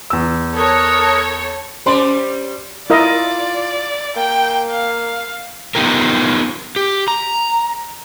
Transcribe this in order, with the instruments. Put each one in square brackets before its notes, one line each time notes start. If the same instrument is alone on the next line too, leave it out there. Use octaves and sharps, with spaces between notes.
[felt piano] E2 E6
[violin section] A4 C#5 [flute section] A#4 D#6 F#6
[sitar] G3 C#4 D5 [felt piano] C5 C6
[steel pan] E4 A#4 D#5 [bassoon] F4 [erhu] D5
[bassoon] A#3 [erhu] G5
[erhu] F5
[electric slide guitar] B3 D#4 F4 G4 A#4
G4
A#5